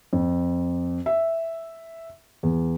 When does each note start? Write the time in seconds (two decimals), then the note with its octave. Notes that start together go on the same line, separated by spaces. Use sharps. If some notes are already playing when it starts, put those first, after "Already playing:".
0.13 F2
1.06 E5
2.43 E2